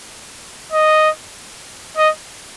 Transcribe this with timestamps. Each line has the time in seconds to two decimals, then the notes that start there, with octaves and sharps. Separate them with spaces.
0.72 D#5
1.97 D#5